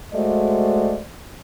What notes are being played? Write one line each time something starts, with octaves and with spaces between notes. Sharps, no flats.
G#3 A3 F#4 C5 D5 D#5